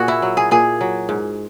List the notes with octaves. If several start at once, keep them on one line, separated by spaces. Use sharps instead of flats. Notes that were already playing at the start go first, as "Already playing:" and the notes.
Already playing: A#2 F#4 G#4
E4
F#3
G#4
A#2 G#4
F#3
G#2